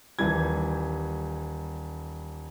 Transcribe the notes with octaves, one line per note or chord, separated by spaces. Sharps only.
D#1 E3 G3 G#6